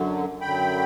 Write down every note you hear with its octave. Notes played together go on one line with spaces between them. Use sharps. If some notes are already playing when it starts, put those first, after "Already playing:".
Already playing: F#2 D3 F#3
F#2 D3 F#3 G5 B5